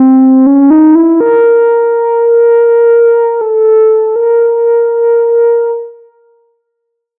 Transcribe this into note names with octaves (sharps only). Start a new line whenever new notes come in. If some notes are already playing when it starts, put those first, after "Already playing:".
Already playing: C4
C#4
D#4
E4
A#4
A4
A#4